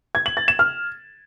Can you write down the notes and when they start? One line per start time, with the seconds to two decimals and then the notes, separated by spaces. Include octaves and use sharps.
0.15 G#6
0.26 F#7
0.37 A6
0.48 E7
0.59 F6